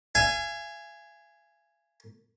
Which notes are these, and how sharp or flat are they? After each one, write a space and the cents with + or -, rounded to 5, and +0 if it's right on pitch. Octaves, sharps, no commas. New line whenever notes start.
F5 -45 G#5 +0